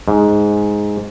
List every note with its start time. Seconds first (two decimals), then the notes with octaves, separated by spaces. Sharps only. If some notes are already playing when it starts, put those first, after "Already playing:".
0.08 G#2